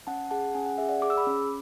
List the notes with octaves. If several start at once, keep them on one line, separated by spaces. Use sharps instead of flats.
C#4 F#5 A5
G#4 F#5 A5
C#4 G#5
F#5
G#4 E5
D5 F#5
G#4 D6
E6
B5 D6
C#4